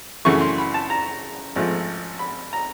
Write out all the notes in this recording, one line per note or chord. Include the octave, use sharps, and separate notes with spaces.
F#2 C#3 E3 A3 C#6
C6
B5
A5
A#5
G#1 G#2 F3 A3
B5
A#5